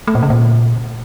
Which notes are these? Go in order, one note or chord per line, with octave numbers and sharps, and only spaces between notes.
A3
A#2
C#3
A#2